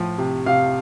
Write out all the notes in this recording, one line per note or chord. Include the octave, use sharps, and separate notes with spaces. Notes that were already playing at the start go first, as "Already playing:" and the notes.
Already playing: A2 F3
C3
C3 F5